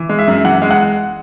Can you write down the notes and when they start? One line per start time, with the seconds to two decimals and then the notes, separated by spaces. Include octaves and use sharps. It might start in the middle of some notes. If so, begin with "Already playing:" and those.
Already playing: E3
0.09 G#3
0.19 E5
0.28 F#2
0.44 E3 F#5
0.62 G#3
0.71 F#5